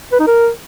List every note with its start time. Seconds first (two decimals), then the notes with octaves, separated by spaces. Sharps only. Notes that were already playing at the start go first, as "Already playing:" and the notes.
0.12 B4
0.19 D#4
0.27 A#4